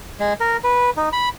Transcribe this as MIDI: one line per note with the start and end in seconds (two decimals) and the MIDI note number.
0.20 0.33 56
0.40 0.57 70
0.64 0.90 71
0.97 1.09 63
1.13 1.29 83